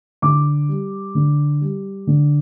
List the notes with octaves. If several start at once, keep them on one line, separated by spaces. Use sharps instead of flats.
D3 D6
G3
D3
G3
D3